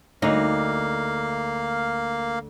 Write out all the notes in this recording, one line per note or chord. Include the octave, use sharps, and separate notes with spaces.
D2 A#3 D#4 F5